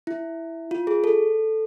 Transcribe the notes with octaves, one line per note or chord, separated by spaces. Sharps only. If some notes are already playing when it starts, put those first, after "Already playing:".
E4
F4
G#4
A4